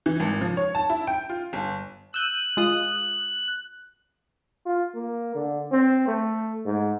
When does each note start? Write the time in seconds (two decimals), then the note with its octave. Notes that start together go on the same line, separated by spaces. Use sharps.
0.06 E3
0.20 G#1
0.41 F3
0.57 C#5
0.75 A5
0.90 E4
1.07 G5
1.29 F4
1.53 G1
2.14 E6 F#6 G6 D#7
2.57 G#3 F4 D#6
4.66 F4
4.95 A#3
5.35 D3
5.72 C4
6.07 A3
6.65 G#2